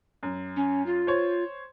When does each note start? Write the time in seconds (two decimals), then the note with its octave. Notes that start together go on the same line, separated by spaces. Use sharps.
0.23 F#2
0.56 C#4
0.86 F4
1.07 C5 C#5